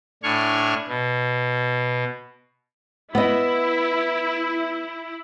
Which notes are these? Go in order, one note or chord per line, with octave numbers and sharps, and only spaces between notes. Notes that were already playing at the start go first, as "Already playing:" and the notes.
A2 D4 G#5 C#6 F6
B2
B3 E4 D#5